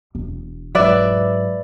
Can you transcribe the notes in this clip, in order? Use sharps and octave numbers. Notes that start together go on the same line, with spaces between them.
E1
G#2 F#3 B4 D5 E5